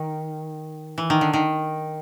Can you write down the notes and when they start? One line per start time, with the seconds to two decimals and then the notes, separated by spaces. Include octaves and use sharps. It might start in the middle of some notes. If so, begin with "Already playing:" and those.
Already playing: D#3
0.98 E3
1.10 D#3
1.21 D3
1.33 D#3